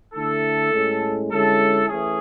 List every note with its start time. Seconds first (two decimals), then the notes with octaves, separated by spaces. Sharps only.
0.14 D3 A3 E4 A4
0.72 A2 G#3 C#4
1.30 D3 G#3 C#4 E4 A4
1.89 E3 A3 C#4 G#4